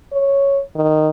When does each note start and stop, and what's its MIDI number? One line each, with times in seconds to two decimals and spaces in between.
0.13 0.61 73
0.75 1.09 51